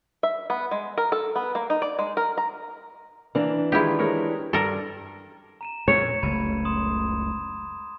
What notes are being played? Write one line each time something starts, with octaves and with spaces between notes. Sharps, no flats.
E5
B3
G#3
A#4
A4
B3
A#3
D#4
D5
G#3
A#4
A#5
E3 A#3 D4
D#3 G#3 E4 F4 G4
G#3 A#4 C#5
G2 A4 A#4
A#5 D#7 E7
F2 A#2 C#5
F#1 C#2 A3 B5 G#6 D#7
C6 D#6 E7